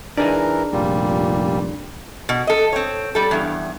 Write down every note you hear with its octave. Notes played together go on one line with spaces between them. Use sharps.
E3 D4 D#4 G#4 A#4 D5
F1 A#2 G3
B2
A4 D#5
C4 C#5
G3 A4
E2 G2